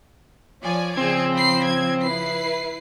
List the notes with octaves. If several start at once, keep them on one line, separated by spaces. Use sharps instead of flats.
F3 C#5 D5 G#5
C#3 F3 C4 G#4 G#6
C5 B5 C7
G#6
E4 B4 C7